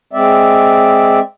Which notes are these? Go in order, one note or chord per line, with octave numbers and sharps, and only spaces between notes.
G#3 C4 D5 E5